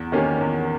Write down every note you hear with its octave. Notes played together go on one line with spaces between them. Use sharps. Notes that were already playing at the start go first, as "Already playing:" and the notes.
Already playing: E2
D#3 A#3 C#4 G4
E2